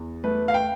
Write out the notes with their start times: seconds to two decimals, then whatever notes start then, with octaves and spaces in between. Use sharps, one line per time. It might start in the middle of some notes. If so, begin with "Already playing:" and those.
Already playing: E2
0.24 A3 B4
0.48 F5
0.54 G5